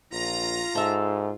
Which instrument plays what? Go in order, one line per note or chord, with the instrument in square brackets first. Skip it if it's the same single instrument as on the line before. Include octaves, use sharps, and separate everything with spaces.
[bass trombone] A#1 [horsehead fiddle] F4 [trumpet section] A#5
[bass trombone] G#2 [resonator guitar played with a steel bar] A4 E5